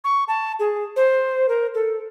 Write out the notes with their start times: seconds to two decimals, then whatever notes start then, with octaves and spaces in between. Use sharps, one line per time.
0.04 C#6
0.28 A5
0.59 G#4
0.96 C5
1.49 A#4
1.74 A4